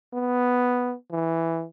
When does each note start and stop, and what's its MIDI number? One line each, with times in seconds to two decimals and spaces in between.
0.14 0.95 59
1.11 1.64 52